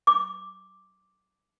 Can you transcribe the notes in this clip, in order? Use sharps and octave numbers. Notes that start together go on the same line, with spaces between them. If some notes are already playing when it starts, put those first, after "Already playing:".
D6